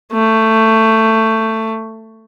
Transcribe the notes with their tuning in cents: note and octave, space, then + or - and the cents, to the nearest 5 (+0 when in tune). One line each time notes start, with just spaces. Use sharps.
A3 +15